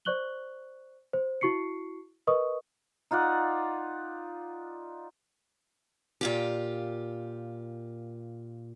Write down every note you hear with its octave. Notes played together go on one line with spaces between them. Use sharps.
C5 D5 C#6 F#6 F#7 G7
C5
E4 F#4 C#6 C7 C#7
A#4 B4 D#5 C#6 D#6
D#4 F4 D5 F#5
A#2 F4 G4